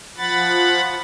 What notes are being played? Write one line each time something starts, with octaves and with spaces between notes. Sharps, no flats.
F3 F#5 B5 A6